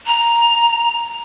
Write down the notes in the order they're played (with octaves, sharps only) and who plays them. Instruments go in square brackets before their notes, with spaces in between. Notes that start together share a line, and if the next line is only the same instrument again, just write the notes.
[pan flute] A#5